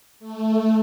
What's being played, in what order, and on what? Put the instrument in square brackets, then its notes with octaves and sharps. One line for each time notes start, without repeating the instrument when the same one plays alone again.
[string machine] A3